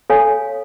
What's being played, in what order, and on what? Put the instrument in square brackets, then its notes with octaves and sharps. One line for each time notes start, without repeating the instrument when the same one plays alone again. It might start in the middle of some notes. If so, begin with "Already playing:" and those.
[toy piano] A4 C#5 F5 G#5